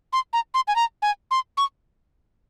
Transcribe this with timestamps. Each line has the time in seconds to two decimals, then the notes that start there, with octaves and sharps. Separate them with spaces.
0.13 C6
0.33 A#5
0.54 C6
0.68 G#5
0.76 A#5
1.02 G#5
1.31 C6
1.57 C#6